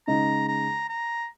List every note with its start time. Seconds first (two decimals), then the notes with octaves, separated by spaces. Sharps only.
0.07 C#3 G#3 D#4 A#5
0.48 A#5
0.89 A#5